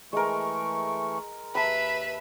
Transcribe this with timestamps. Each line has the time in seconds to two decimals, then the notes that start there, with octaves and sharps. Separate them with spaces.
0.13 E3 G#3 A3 A#4 C#6
1.55 D#2 B4 E5 A5 B5